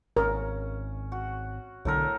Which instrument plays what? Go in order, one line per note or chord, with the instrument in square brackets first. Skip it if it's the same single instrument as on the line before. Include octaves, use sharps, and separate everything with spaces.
[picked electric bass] G#1 [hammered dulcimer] C#4 [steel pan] A#4
[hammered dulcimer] F#4
[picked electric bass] B1 D3 [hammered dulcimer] A2 A4 A#4